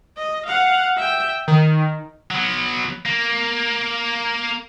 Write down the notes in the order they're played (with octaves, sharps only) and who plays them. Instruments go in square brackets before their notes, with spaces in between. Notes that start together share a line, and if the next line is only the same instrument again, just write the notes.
[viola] D#5
F5 F#5
E5 G5
[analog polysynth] D#3
[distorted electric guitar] F#3 B3
A#3